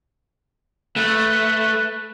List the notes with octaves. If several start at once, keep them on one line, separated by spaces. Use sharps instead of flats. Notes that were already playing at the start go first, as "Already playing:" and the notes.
A3 B4